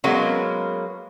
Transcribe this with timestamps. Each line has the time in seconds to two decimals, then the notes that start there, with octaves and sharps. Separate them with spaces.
0.04 F#3 G#3 A#3 B3 C#4